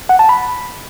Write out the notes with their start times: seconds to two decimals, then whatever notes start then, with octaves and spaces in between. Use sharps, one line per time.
0.09 F#5
0.19 A5
0.29 B5